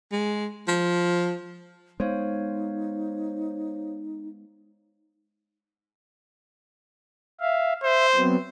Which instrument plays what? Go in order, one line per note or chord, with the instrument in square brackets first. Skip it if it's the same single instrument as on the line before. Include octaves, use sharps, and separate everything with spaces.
[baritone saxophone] G#3
F3
[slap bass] G#3 B3 [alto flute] D#4 [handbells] C5 C#5 F5
[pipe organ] E5 F5
[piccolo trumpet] C5 [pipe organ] E5
[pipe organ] F#3 B3 C4